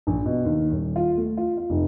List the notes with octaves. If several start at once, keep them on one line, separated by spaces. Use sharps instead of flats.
A#1
B2
D#2
D#1
F4
A3
F4
F4
F1